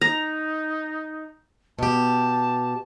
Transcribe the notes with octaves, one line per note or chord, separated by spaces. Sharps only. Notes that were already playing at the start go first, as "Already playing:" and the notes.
D#4 A#5
B2 G4 A5